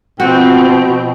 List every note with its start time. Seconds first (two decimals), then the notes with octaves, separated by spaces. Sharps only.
0.20 B2 F3 C4 F#4 G5